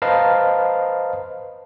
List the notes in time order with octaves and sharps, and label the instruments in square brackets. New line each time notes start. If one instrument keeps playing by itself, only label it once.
[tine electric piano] B4 C5 D#5 F5 A5 A#5